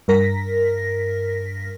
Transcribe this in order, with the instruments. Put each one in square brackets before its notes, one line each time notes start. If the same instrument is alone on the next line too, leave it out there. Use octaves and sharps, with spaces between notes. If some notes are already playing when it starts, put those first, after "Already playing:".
[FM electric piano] G2 A#4 A#6 B6